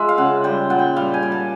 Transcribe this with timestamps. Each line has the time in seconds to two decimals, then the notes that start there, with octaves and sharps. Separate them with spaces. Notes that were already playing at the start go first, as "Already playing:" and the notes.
Already playing: F3 G#3 E5
0.09 F5
0.18 C#3 F#5
0.44 G3 G5
0.70 A#2 F#5
0.79 G5
0.96 G3 F5
1.14 G#5
1.23 G3
1.32 A5